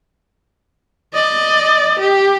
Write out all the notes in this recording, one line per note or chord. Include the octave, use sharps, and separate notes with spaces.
D5 D#5
G4